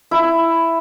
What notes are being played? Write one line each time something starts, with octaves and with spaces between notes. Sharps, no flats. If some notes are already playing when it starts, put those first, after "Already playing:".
E4